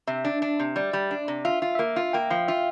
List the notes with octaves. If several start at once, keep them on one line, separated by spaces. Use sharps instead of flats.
C3 E5
D4
D4
C3
G3 D5
G3
D4
C3
F4 E5
F4
E5
A#3 F5
F4
A#3 G5
F3 F5
F4 E5